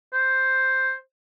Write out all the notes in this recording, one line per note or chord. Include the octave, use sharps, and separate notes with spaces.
C5